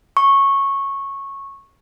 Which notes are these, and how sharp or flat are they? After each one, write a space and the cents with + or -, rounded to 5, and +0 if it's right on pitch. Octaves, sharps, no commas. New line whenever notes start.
C#6 -15